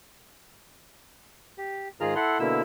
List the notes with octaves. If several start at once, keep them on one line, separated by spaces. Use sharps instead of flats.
G4
G#2 D#3 F4 G#4 A#5 F6
E4 A4 F#5 C6
B2 D3 A#3 E4 E6